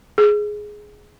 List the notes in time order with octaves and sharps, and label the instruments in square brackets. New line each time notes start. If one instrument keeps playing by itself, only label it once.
[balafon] G#4